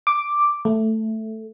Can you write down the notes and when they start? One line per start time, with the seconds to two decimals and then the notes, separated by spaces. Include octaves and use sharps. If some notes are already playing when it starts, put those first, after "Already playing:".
0.07 D6
0.65 A3